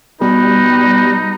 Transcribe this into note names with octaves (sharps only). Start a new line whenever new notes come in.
B2 G3 D#4 B4